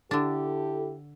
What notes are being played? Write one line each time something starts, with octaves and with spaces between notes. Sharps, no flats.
D3 D4 E4 G4 A4